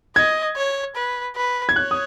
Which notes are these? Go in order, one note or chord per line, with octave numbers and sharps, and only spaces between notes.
D#5 G#6
C#5
B4
B4
G#6
C#5 F#6
D#6